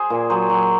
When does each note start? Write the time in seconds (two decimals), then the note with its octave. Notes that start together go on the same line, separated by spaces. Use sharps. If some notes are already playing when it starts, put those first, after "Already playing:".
Already playing: G#4 C5
0.10 A#2
0.30 F#3 G#4 C5
0.50 F#3